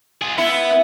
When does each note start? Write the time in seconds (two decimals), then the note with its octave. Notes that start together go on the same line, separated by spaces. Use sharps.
0.22 F4 G#4
0.38 B3 E4